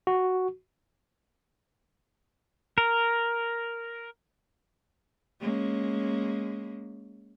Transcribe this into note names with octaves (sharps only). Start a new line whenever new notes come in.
F#4
A#4
G#3 A#3 C#4